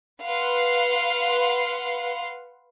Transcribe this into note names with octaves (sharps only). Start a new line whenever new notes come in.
B4 F5 F#5 C6